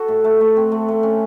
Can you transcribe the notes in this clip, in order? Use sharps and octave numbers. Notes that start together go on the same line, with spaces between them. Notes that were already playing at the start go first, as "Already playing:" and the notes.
Already playing: F#4 A4
A2
A3
A3
C4
A3
A3
C#4